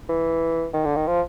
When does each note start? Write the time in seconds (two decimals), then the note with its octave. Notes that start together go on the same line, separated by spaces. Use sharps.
0.09 E3
0.73 D#3
0.85 D3
0.96 D#3
1.07 F3